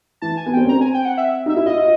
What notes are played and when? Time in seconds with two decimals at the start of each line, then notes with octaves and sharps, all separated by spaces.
0.22 E3 A5
0.37 G#5
0.46 B3
0.53 C4 G5
0.64 C#4
0.69 C4 A#5
0.81 G#5
0.94 G5
1.05 F#5
1.18 E5
1.46 D#4 E5
1.56 E4
1.66 F4 D#5
1.78 F4